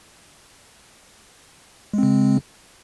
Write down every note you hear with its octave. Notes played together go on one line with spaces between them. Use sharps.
C#3 G#3 C4